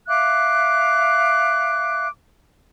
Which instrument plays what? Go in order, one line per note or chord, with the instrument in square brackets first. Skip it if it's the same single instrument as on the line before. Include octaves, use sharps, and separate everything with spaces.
[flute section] E5 F5 D6 F#6